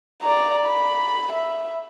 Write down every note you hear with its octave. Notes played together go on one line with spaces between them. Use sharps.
D5 A#5
B5
E5